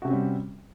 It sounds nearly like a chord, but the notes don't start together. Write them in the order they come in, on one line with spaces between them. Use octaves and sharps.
F#4 C3 C#4 C4 G3